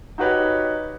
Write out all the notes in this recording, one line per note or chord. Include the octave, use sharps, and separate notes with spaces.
D#4 F#4 G4 B4 C#5